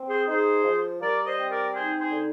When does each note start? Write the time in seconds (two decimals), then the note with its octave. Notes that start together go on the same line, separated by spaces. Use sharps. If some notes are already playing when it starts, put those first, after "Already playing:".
Already playing: C4
0.08 G#4 C5
0.26 D#4 G#4 C5
0.64 F3
1.01 G3 A#4 D5
1.25 C5 D#5
1.38 C4
1.49 A#4 D5
1.74 D#4 G#4 C5
1.99 G#4 C5
2.11 D3